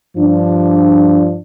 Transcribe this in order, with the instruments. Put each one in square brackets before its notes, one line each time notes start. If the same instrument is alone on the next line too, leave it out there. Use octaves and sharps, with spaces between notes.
[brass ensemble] G2 F3 D4